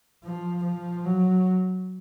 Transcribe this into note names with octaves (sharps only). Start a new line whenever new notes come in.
F3
F3
F#3